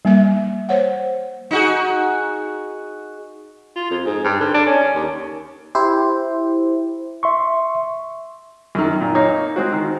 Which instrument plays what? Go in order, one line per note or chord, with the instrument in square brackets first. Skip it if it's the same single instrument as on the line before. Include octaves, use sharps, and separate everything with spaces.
[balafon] G3 A#3 E5
C5 C#5 F#5
[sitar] D#4 F#4 G#4
[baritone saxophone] F4
F2
G#2
G2
D3
D4
C#4
D#2
[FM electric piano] E4 G4 C5
[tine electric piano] E5 C6 C#6
[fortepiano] F#2 D#3
A#2
A#3 D#4 C#5
G#3 C4 F#4
D#3